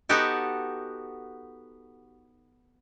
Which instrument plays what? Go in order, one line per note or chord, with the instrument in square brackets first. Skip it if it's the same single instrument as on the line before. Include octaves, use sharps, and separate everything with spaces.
[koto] B3 D#4 F#4 G4 A4